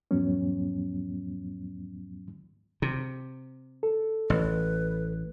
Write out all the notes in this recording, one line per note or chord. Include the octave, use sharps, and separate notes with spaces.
E2 G#2 F3 F#3 B3 C#4
C3
A4
A1 B4